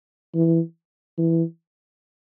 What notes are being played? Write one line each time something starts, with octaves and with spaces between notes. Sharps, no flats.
E3
E3